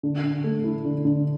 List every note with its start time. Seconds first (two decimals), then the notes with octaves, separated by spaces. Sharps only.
0.03 D3
0.24 D3
0.44 A3
0.64 E4
0.85 D3
1.05 D3